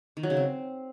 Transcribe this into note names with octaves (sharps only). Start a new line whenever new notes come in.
D#3
F#3
C#3
C4